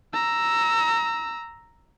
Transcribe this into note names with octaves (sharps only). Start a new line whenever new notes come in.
A#5 E6